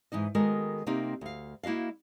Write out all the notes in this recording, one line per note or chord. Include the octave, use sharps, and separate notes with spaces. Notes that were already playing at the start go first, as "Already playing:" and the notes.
G#2 E3 D#4 D#5
D#3 G#3 B3 F#4 A4 A#4
C3 A#3 C4 D#4 G4
D2 F5
A#3 E4 F#4 D#5 F5